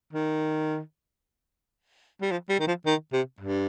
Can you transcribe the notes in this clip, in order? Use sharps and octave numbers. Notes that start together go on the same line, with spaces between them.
D#3
G3
F3
G3
D#3
F3
D#3
C3
G2